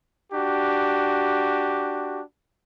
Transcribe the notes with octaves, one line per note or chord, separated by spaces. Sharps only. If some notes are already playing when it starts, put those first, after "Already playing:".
D4 F#4 G4